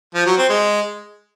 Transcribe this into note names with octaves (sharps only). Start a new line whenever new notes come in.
F3
F#3
C4
G#3